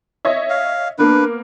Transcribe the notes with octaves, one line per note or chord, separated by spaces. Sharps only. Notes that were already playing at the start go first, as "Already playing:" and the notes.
C#5 D#5 E5
F5
A#3 B3 D4 B4